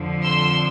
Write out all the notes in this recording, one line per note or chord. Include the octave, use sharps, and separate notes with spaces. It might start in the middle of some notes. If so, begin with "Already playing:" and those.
Already playing: F2 D3 F3
C6 E6